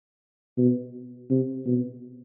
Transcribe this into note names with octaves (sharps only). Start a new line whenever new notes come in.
B2
C3
B2